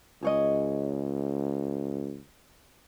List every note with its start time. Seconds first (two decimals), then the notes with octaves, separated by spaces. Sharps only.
0.23 C#2 G#4 C#5 D#5